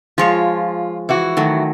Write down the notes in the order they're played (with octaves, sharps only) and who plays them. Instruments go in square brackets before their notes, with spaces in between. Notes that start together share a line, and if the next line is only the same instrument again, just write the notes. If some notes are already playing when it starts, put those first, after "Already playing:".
[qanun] F3 G#3 C#5 [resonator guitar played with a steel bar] F4
[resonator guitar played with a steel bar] E3 E4 F#4
[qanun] D#3 F#3 A3